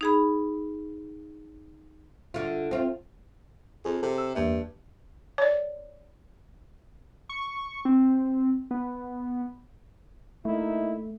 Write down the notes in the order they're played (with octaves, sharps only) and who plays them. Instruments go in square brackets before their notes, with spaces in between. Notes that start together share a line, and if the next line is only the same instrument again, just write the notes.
[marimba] D#4 G#4 B5
[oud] D3 F4
C4 F4
[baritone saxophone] F2 [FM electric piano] G#4
[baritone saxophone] C3 [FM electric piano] A4
[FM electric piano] E6
[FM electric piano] E2 A#3 E5 [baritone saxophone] G2
[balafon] C#5 D5
[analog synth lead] C#6
C4
B3
[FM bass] A3 [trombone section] A#3 D#4 E4